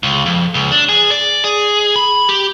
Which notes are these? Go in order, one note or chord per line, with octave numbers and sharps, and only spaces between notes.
C#2
F2
C#2
D4
G#4
D5
G#4
B5
G4